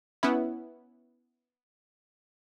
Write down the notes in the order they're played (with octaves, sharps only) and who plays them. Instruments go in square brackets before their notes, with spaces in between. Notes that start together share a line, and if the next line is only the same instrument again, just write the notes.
[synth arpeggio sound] B3 C#4 E4